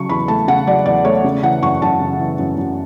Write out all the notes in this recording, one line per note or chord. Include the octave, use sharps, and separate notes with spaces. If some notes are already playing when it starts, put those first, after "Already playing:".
Already playing: C#3 F#3 C#6
E2 B5
A3 A5
C#3 F#5
F#3 D5
E2 D5
A3 C#5
C#3
E3 F#5
F#2 C#6
F#2 A5
C#3
E3
F#2
F#2